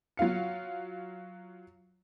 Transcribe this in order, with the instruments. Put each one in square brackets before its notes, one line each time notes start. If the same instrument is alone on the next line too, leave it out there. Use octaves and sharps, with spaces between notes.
[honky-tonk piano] F#3 F4 F5 C#7